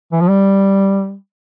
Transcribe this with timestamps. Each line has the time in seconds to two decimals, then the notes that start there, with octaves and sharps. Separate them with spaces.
0.12 E3
0.21 F3
0.29 G3